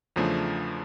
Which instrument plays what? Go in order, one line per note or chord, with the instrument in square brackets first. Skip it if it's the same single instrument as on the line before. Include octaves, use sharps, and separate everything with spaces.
[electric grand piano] E2 C#3 F3 A3 D4